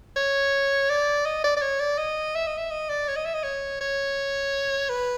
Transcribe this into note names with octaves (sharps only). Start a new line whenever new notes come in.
C#5
D5
D#5
D5
D5
C#5
D5
D#5
E5
D#5
E5
D#5
D5
C#5
D#5
E5
D#5
C#5
C#5
B4